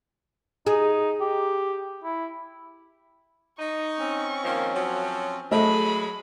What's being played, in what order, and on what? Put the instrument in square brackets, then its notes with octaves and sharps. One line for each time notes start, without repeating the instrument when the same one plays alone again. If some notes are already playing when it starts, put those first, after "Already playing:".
[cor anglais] D#4 [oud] G#4
[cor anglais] G4
E4
[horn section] D#4 [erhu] C#6
[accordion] C4 C#4
[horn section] D#3 F3 A#3
F3 F#3
[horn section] F#3 G#3 [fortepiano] A3 D#5 [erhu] B5